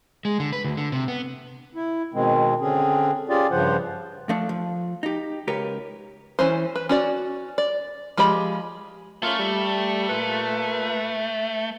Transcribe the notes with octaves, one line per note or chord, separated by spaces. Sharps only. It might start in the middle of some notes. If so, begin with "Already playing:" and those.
G#3
D3
B4
D2
D3
C3
B3
E4
B2 D#3 G#3 C4
D3 C4 C#4 G#4
C#4 F4 G4 G#4 D5
G2 C#3 F3 C5 F#5
F3 A3 D4
F3
D#4 G4
C#2 G4 A#4 B4 C#5
E3 C#4 C5
B4
C#4 F#4 D5
D5
F3 G#3 G4 D#5 B5
A3 A#3 C#4 F4
G3
A#2 B4